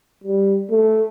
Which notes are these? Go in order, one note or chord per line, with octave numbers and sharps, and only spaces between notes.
G3
A3